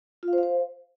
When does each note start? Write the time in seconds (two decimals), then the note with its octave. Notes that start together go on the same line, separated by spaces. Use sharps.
0.23 F4
0.28 F5
0.33 C5
0.38 F5
0.43 C5